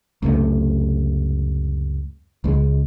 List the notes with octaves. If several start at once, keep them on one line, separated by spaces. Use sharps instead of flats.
C#2 F#2 C3 A3
C#2 G#3